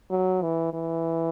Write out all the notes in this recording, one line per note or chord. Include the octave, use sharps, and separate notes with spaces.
F#3
E3
E3